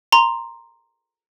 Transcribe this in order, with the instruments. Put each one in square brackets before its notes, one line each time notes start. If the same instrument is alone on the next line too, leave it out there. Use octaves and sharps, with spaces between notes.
[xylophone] A#5 C6